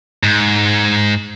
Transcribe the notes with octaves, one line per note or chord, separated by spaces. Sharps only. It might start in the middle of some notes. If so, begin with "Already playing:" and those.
G#2